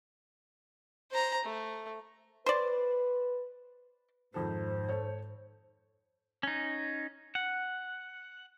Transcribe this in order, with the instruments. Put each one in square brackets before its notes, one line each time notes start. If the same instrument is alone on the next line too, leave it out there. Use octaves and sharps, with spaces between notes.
[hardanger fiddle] C5 A#5
A3
[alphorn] B4 [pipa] C5 D5
[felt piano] F2 D#3 A4 [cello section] G#2 [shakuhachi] C5
[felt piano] A4 C#5
[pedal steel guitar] C#4 D#4
F#5